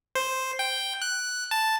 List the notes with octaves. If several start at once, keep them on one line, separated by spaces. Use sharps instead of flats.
C5
G5
F#6
A5